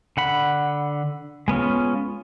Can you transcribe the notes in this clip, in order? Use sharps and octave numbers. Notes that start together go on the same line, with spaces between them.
D3 F#5 B5
G#3 B3 C#4 F4